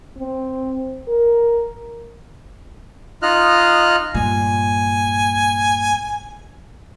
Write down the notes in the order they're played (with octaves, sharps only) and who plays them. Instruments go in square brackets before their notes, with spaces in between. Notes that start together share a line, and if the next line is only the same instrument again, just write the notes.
[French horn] C4
A#4
[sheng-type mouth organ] D#4 F4 D#5 F6 F#6
[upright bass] G2 A#2 [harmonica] G#5